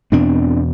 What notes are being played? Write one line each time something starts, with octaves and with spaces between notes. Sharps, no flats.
E2 B2 C4 D4